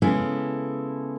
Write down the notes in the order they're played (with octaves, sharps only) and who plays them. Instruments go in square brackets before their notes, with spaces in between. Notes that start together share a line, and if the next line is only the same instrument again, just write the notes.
[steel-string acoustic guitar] C#3 G#3 B3 E4 A4